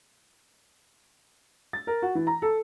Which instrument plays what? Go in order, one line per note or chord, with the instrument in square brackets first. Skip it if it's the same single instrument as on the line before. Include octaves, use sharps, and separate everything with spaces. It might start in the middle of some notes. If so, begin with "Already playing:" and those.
[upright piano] A6
A#4
F#4
E3
A#5
A4